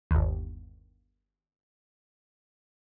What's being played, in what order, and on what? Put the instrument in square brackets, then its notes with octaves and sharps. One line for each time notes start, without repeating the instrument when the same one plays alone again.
[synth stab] G1 D#2